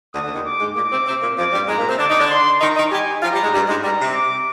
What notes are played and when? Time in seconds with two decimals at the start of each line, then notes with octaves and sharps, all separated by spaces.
0.14 D2 D3 D#6
0.24 D2 D3
0.35 D#2 D#3
0.46 D6
0.61 G#2 G#3
0.76 A#2 A#3 D6
0.91 C3 C4
1.07 C3 C4
1.22 A#2 A#3
1.37 F2 F3 D6
1.53 G2 G3
1.68 G#2 G#3 A#5
1.78 A#2 A#3
1.89 C3 C4
1.99 D3 D4 D6
2.09 D#3 D#4
2.19 D3 D4
2.30 C6
2.61 D#3 D#4 A#5
2.76 D#3 D#4
2.92 G3 G4 G#5
3.23 F3 F4 A#5
3.33 G3 G4
3.43 G#2 G#3
3.53 G2 G3
3.69 G#2 G#3
3.84 G2 G3 A#5
4.00 C3
4.15 D6